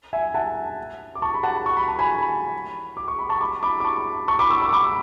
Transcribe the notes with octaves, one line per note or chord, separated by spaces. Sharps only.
E5 G#5
F#5 A5
D6
A5 C#6
B5
F#5 A5
C#6
B5
A5
G#5 B5
D6
C#6
B5
A5 C#6
B5 D6
B5 D6
D6
A5 C#6
A5 C#6
B5 D6
C#6 E6
C#6 E6
B5 D6